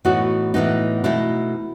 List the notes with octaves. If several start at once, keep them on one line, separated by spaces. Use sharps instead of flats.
A2 E3 B3 D#4 F#4
A2 E3 B3 D#4
B2 A3 D#4 E4